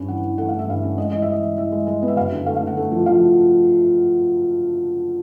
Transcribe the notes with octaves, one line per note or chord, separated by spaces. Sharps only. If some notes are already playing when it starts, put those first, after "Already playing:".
Already playing: G2 C#4
E3 F#5
E3
A3 F#5
E3 F5
E5
G2 F5
C#4
G#3 D#5
E3 D#5
E5
E3 D#5
E3
E3 E5
G#3
G#3
B3
E5
F#2 F5
D3
A3 F5
F5
D3
F#5
A3
F3
F3 F5